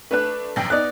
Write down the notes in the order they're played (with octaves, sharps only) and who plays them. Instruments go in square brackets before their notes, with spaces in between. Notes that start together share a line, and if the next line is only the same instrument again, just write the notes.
[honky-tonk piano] A3 D4 [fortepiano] B4 F#6
[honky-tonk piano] A#1 F#2 G5
[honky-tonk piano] B3 D#4 [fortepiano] D5 F#6